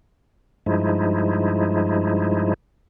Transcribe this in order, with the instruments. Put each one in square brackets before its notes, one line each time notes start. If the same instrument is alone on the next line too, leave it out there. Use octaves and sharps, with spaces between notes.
[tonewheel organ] G2 F3 G#3 D#4 E4